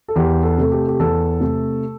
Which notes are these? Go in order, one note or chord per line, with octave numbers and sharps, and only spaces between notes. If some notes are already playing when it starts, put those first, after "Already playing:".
A4
E2 G4
A4
C3 A3
G4
G4
E2 A4
C3 A3